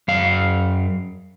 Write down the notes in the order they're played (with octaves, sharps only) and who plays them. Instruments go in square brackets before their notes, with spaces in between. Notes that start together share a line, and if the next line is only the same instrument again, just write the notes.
[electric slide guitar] F#2 F5